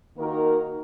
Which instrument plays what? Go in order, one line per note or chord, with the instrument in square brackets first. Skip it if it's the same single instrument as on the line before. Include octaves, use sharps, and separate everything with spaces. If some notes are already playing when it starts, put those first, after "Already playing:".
[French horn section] D#3 A#3 D#4 F#4 A#4